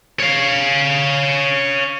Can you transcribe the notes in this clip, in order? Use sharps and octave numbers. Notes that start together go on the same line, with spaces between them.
C#5 F5